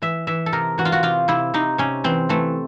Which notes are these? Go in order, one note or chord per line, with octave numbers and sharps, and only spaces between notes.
E3 E5
E3 E5
A4
C3 A#4
E3 F#4
F4
F#4
C3 F4
C3 E4
C3 D#4
C3 C#4
E3 C4
E3 A3